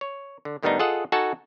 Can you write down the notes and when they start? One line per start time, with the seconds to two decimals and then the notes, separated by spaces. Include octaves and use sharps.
0.01 C#5
0.45 D3
0.63 A2 D#3 G3 B3 D4 D#4
0.79 F4 G#4 A4 D#5 F#5
1.12 D#4 F#4 A4 F#5 G#5 A5